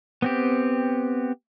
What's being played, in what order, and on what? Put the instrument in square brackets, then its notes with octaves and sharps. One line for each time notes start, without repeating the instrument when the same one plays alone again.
[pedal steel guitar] B3 C4 G4